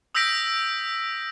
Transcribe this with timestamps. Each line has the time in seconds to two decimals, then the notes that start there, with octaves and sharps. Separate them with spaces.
0.15 D#6 E6 G6 A#6 B6 D7